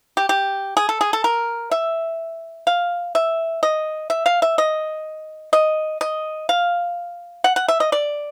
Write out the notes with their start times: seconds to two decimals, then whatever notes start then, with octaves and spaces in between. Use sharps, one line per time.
0.17 G4
0.29 G4
0.77 G#4
0.89 A4
1.01 G#4
1.13 A4
1.24 A#4
1.71 E5
2.67 F5
3.15 E5
3.63 D#5
4.10 E5
4.26 F5
4.42 E5
4.58 D#5
5.53 D#5
6.01 D#5
6.49 F5
7.44 F#5
7.56 F#5
7.68 E5
7.80 D#5
7.92 D5